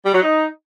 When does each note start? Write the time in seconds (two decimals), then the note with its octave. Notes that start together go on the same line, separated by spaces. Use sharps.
0.05 G3
0.13 F#3
0.21 D#4